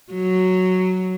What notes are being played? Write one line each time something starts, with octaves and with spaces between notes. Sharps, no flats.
F#3